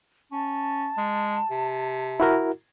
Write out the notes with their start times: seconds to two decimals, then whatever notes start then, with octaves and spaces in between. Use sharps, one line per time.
0.32 C#4 A5
0.97 G#3
1.50 C3
2.20 E4 F#4 A#4